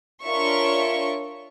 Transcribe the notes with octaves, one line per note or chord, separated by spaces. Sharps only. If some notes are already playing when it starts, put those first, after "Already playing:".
D4 F4 A#4 C#5 E5 C#6